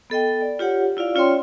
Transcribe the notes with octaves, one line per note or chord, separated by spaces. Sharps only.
B3 A4 D#5 G5
D5
F4 G4 C#5 F#5
E4 F4 D5 F5
C#4 F4 C#5 D5 G5 C6